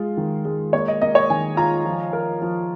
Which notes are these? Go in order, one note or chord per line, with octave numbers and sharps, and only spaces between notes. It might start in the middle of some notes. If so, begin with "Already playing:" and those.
Already playing: G#3 F4
D#3
G#3
A#3 C#5
D#5
A#3 D#5
C#5
D#3 G#5
F4 A#5
F3
A#4
F3